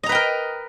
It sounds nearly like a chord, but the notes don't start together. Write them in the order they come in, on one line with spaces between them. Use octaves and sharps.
D#5 A#5 B4 G5 A#4